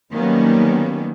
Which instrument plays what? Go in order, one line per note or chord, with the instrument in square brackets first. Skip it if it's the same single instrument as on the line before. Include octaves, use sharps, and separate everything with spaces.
[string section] D#3 F#3 G3 A#3 B3 C#4